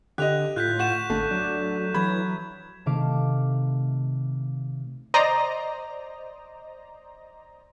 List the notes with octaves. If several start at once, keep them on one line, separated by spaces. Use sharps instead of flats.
D3 G4 D#5 F#6 F7
A2 F4 F#6 G6 B6
F#5 C#6 G6 E7
G#1 D3 A3
F#3 D4
E3 F#3 B5 G#6
C3 D#3 A3 F5 D6
C5 D5 D#5 A#5